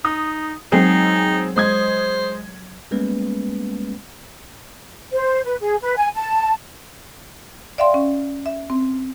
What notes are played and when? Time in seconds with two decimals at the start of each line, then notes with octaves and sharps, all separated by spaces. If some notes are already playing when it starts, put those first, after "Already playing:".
0.05 D#4 D#6
0.72 F#3 G#3 C4 D#4 G#4 A#4 C7
1.56 G#3 C5 D#6 G#6
2.91 G3 G#3 A#3 B3 C#4 B4
5.12 C5
5.45 B4
5.60 G#4
5.82 B4
5.97 G#5
6.14 A5
7.78 D5 E5 F5 G5 C6
7.94 C#4
8.46 E5
8.70 C4